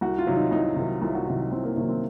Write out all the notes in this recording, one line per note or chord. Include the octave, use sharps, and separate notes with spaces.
C2 F#4
F4
C3 D#3 F#3
D#4
C2 D#4
C3 D#3 F#3
C2 F4
F#4
C3 D#3 F#3 D#4
D#4
C2 C4
A#3
C3 D#3 F#3 A#3
C4